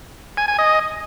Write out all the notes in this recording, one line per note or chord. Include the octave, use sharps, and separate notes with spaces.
G#5
G#5
D#5